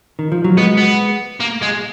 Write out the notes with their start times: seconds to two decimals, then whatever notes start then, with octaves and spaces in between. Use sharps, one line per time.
0.19 D#3
0.32 F3
0.44 F#3
0.57 G#3 B3
0.78 B3
1.40 A#3
1.62 G#3